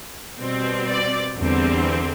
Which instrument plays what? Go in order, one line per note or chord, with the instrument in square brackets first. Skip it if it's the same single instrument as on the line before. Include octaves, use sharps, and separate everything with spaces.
[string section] B2 G3 C4
D5
E2 D3 G3 C4